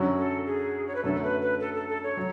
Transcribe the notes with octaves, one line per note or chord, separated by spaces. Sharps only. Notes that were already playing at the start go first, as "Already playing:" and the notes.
Already playing: F#2 D3 F#3 C#4 F#4
A4
G#4
C#5
B4
F#2 D3 A3 A4
B4
B4
A4
A4
A4
C#5
F#3